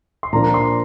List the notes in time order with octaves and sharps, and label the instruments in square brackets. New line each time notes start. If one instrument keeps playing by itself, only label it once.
[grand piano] C6
A#2 F3 A#3 D4 A#5
C6